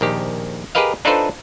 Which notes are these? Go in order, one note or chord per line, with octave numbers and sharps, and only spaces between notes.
A#1 D#3 G4
G4 G#4 A#4 B4 D#5 F5
D4 D#4 F4 A4 B4 C5